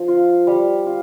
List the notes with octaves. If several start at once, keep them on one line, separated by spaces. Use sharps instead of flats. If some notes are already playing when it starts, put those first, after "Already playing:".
Already playing: F3
F4
G3
F4